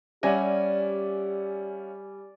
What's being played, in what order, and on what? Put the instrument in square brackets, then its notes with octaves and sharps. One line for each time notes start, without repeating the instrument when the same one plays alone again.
[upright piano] G3 A#6 [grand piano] C#4 E5 F#5 [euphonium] G4 [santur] D5 G#5